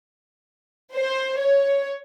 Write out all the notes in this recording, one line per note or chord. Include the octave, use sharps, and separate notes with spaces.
C5
C#5